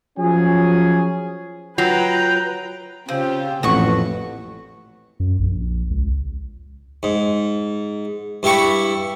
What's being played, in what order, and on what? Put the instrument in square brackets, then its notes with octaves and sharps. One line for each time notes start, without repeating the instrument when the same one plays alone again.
[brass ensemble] F3 F#3 C#4 G#4
[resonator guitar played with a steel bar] F#3 [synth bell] F4 [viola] B4 A#5 [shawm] G5
[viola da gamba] C#3 [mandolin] C4 [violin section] F4 G4 C5
[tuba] A1 [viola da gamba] F2 A#2 [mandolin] F#4 C#6 [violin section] A4 B4
[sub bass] F#2
A#1
C#2
[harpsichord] G#2
G2 E4 G4 B5 C#6